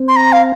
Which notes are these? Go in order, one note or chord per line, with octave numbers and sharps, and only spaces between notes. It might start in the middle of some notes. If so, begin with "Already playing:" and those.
Already playing: C4
C6
A#5
F5